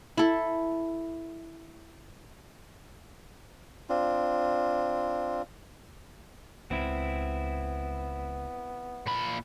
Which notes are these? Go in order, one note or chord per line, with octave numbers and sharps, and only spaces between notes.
E4 A4
C4 D4 F4
C#2 B3 C4 E4
A#2 B5